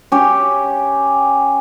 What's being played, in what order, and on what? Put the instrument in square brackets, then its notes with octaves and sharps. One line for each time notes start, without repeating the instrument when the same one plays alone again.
[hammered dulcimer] C#4 G4